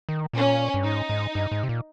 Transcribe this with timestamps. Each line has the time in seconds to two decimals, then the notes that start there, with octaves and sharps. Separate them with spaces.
0.09 D#3
0.33 A#2 C#4
0.74 G2
0.84 G#2 D#4
1.10 G#2
1.35 G2
1.52 G#2
1.63 C3
1.69 A#2